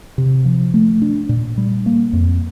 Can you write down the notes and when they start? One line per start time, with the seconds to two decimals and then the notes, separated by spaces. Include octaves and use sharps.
0.18 C3
0.45 F3
0.74 A3
1.02 D4
1.29 A#2
1.58 G3
1.86 A#3
2.13 F2